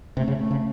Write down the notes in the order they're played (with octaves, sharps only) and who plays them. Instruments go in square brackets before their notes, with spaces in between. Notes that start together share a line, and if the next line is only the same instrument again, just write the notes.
[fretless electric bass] C3 [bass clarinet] A3
[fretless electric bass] C#3
[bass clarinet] A3
[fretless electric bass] C#3